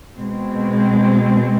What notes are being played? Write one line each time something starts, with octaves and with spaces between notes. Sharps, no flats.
B2 G#3 C4